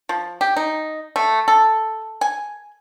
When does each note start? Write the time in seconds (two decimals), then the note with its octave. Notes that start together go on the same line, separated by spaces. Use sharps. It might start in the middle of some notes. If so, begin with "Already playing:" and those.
0.09 F3
0.41 G4
0.56 D#4
1.16 A3
1.48 A4
2.21 G#5